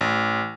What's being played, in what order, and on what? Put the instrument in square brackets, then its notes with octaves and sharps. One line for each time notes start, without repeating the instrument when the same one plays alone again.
[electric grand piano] A1